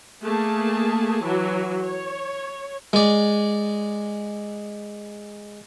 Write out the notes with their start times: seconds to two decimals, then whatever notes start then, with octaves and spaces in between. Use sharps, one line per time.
0.23 A3 A#3 G#4 A5
1.23 E3 F#3 F#4
1.81 C#5
2.93 G#3 D5